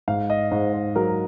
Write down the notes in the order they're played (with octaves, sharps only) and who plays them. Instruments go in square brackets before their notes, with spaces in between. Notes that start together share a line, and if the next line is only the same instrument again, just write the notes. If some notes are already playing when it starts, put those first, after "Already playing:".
[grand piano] G#2 F5
D#5
G#2 C5
C5
F#3 A#4